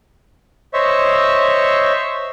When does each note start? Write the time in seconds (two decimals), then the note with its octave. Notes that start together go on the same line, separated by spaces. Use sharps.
0.74 C5 C#5 D#5 E5 C#6 E6